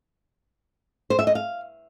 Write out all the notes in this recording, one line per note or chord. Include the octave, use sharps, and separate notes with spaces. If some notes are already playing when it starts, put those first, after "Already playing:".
C5
E5
D#5
F5